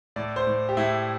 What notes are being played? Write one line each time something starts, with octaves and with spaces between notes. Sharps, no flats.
A2 D5
C5
A2
G4
A2 E4